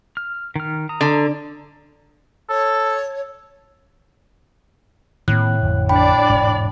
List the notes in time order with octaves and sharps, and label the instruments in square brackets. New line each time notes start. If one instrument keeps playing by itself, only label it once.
[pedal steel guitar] F6
D#3 F6
A#5 D#6
[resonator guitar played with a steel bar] D3
[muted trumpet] A4 [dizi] C#5
[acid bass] A2 [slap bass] D#3 A#3 C4 [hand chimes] F#6
[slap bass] A1 F2 D3
[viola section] D4 D5 [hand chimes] G5 B5
[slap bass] E1 G#2